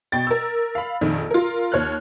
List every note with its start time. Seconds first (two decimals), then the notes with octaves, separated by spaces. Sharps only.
0.12 B2 G5 A6
0.27 A#4 E6
0.75 F5 B5
1.01 A#1 F2 D#3
1.31 F4 A#4
1.72 D#2 C#5 F6 F#6